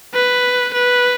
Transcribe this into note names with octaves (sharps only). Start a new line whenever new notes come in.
B4
B4